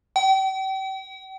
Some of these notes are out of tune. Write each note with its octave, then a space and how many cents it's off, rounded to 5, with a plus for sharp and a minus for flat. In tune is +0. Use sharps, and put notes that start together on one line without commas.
G5 -40